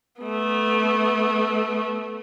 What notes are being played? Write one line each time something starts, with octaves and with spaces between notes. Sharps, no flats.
A3 B3